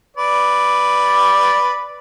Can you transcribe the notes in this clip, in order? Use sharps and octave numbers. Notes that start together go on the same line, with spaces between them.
B4 D5